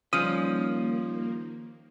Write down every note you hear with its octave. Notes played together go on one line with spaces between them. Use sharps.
D#3 F3 G3 A#3 C#4 D#6